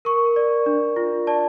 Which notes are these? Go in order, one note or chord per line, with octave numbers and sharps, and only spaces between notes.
A#4 C#6
D5
D4
F4
D5 A5